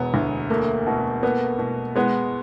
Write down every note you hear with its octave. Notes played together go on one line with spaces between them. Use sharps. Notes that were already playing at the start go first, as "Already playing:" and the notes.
Already playing: E1 B3
D2
A3 A#3
B2
A#3 B3
B2
G#3 B3